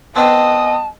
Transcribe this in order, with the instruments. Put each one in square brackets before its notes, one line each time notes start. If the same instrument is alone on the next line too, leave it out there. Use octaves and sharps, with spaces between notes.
[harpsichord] B3 C4 [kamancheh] D#5 D#6 [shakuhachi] A5